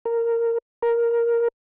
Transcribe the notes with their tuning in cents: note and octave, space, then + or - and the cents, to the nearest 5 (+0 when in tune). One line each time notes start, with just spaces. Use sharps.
A#4 -10
A#4 +5